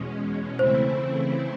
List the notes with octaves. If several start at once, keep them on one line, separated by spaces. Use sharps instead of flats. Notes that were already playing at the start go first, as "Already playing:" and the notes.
Already playing: E2 B2 G#3 C#4
C#3 E3 A3 C4 E4 C5